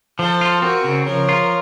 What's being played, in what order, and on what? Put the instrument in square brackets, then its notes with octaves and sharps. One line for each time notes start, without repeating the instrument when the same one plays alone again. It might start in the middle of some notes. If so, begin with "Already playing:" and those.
[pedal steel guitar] F3 [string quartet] A4 C5
[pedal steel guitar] F4
[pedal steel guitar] C4 [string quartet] F#4 A#4
[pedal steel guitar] C#3
[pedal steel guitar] F3 [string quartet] A#4 C#5
[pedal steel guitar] F4